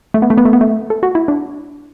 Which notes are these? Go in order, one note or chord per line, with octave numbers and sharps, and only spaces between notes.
A3
B3
A3
B3
A3
B3
A3
A4
F#4
E4
D4